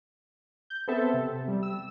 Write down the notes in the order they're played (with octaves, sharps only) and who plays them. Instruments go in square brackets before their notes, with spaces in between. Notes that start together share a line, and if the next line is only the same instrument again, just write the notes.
[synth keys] G6
B3 C4 A4 E5 A5
C3
G3
E6